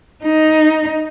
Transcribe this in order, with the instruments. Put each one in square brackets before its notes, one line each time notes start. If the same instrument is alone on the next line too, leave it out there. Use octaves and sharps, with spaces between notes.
[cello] D#4